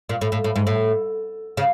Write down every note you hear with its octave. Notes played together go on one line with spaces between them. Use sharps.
A#2
A2
A2
A2
G#2
A2
C#3